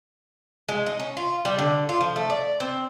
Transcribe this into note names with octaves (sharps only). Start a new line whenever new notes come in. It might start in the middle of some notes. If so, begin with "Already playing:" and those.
G#3
D#4
C#4
F4
G3
D3
F4
F3
A3
D5
C4